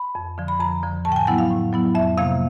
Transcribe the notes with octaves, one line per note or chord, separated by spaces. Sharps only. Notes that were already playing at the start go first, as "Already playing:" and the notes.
Already playing: B5
F2
D3 F3
B5
F2 A#5
D3 F3
A2 A5
G5
G#5
F#3 B3 E4 F#5
F5
A2
F#3 B3 E4
F2 E5
C3 F3 A#3 F5